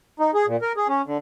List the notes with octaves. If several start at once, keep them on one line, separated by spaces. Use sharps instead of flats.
D#4
G#4
A#2
A#4
G#4
C#4
D3